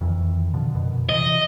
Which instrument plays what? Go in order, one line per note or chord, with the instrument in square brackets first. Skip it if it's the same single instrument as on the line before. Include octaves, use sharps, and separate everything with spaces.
[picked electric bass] F2 D#3 E3
B2 D3 F3
F#2 B2
[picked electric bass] C3 E3 [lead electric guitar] D#5